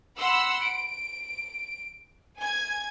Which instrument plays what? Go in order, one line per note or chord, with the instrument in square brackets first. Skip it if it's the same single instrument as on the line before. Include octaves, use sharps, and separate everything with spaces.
[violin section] F#5 B5 C6 E6
D7
G#5 G#6